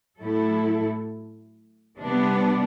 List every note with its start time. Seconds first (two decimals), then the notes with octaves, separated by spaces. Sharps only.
0.19 A2 F#3 A3 E4 A4
2.00 C3 G3 B3 D4